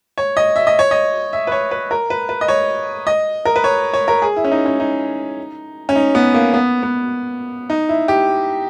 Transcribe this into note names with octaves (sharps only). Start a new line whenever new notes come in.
C#5
D#5
E5
D#5
C#5
D#5
E5
B4
C#5
B4
A#4
B4
B4
D#5
C#5
D#5
A#4
B4
C#5
C#5
A#4
G#4
E4
C#4
D#4
C#4
D#4
C#4
D#4
B3
A#3
B3
B3
D#4
E4
G4